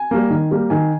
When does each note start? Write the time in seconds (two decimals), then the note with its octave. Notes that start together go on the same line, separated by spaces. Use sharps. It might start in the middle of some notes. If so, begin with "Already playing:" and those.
Already playing: G#5
0.11 G3 A#3
0.30 D#3
0.51 G3 A#3
0.70 D#3 G#5